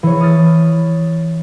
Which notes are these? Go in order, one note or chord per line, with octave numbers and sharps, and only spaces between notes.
E3 C#5
D#6 F6 A6